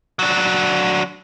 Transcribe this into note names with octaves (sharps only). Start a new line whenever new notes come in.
F#3 D4